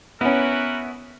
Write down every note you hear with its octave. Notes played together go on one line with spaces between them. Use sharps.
B3 C#4 E4 F#4 A#4 B4